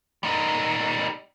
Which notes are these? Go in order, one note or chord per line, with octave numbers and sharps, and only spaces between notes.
G3 D#4